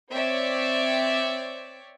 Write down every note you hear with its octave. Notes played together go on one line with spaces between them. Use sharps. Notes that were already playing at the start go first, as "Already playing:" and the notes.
C4 C#5 D5 E5